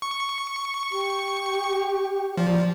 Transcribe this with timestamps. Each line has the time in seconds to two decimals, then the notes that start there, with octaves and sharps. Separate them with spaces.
0.02 C#6
0.92 G4
2.37 F3 D5